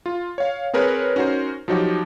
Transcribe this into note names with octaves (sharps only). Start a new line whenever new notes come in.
F4
C#5 F5
C4 G#4 A#4 B4 C#5
C#4 D#4 F#4 A#4 C5
F3 F#3 D#4 F#4 G4